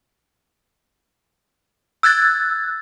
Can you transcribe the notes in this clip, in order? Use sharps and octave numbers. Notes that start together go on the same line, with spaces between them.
E6 F#6 G#6 A6